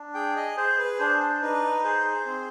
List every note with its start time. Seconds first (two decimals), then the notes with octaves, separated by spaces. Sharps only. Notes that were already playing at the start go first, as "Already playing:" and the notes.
Already playing: D4
0.14 G#4 G5
0.36 D#5
0.57 G#4 C5
0.79 B4
0.99 D4 C5
1.20 C5
1.42 D#4 B4
1.84 G#4 C5
2.26 C4